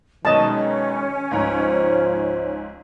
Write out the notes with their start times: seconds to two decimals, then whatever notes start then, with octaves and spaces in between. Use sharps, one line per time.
0.25 F#2 B2 D#3 G#3 C#4 C#5 D#5 A5
1.31 C#2 G#2 F3 F4 C5 A#5